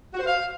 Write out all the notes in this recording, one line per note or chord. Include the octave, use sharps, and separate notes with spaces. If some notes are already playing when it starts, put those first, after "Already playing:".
F#4
C5
F5